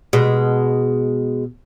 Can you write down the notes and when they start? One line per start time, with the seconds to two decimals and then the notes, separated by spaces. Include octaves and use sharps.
0.13 B2 G#3